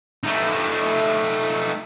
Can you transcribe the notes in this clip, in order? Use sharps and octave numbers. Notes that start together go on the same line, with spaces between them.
A3 D#4